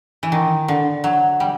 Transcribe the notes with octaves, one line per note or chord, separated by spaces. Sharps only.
E3
D#3
D3
F#3
G3